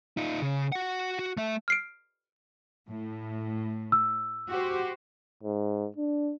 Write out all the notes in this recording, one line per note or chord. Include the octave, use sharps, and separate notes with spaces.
D#4 F4
C#3
F#4 F#5
F#4
A3 E5
F6 C7 D7
A2
E6
F#4 G4 C5
G#2
D4